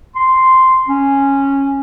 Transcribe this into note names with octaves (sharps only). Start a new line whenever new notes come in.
C6
C#4